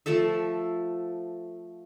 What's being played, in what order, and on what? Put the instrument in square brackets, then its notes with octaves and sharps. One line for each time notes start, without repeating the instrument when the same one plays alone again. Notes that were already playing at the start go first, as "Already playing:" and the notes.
[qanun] F3 A3 A4 E5